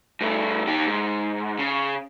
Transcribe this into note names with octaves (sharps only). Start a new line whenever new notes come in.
G2 A3
D#3 G4
G#2
C#3